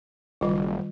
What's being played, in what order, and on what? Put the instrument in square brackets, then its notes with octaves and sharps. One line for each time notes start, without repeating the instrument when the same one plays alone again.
[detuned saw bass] F#1 [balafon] D#3 G3 F4